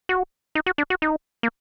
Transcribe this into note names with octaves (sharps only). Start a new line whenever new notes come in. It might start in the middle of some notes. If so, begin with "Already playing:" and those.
F#4
D#4
F#4
D4
F#4
D#4
A#3